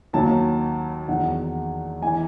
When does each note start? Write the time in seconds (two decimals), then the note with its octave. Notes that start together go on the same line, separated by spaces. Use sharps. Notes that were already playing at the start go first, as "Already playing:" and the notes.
0.13 D#2 D#3 F#3 A5
1.08 E2 D#3 F#3 F#5
2.02 E3 G#5